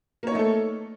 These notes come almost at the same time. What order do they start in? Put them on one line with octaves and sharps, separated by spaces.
A#3 C#5 D#4 A3 A4